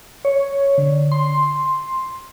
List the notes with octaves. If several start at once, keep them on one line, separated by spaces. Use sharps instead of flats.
C#5
D3
C6